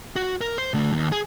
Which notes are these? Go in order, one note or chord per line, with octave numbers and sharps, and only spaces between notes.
F#4
A#4
C5
D3 A3
D#2
G#4